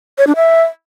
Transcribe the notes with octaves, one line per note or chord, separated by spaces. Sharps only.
C#5
D4
E5